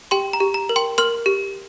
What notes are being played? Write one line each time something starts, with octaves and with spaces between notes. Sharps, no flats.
G4 G5 C6
A#5
G4
A#5
A#4
G5 C6
A#4 C6 F6
G4